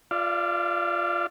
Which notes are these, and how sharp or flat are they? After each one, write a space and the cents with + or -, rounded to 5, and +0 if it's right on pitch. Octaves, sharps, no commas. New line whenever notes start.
F4 +0 D5 +5 F5 -45